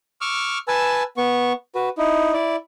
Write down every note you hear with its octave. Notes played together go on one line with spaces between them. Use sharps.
C#6 D6 E6 F6
B4 G#5 A5 E6
B3 C#6
F#4 B4
D#4 E4
E4 D5